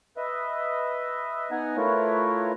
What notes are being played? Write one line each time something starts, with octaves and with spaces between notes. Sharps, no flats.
B4 D#5 E5
B3 D#4 F#5 G#5 A#5
A3 E4 F4 A#4 B4 C#5